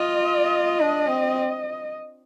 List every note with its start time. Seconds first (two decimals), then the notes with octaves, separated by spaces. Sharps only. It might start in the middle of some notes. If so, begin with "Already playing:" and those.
Already playing: F4 D#5
0.80 D4
1.09 C4